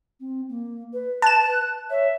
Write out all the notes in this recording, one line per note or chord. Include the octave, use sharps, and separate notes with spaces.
C4
A#3
B4
A5 F#6 E7
C#5 E5